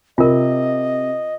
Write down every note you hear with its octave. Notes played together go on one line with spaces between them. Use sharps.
C3 F4 A#4 D#5